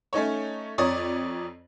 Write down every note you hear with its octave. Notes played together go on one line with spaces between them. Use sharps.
A3 C#4 D#4 C#5
F2 C#5 D5 A#5 D#6